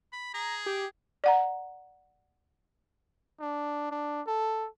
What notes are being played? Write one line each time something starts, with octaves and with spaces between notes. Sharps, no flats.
B5
G#4 A#5
G4
D5 F#5 A#5
D4
D4
A4